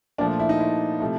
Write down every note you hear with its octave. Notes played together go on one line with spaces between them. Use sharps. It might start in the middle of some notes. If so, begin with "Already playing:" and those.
A#2 F3 A3 D4
E4
D#4
E4
C3 F3 A3